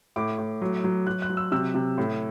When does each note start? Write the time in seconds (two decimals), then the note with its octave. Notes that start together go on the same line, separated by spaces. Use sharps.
0.16 A2 D6
0.38 A2
0.61 F#3
0.84 F#3
1.07 F#3 F#6
1.22 F#6
1.29 F#3
1.37 E6
1.52 C3 E6
1.75 C3
1.98 A2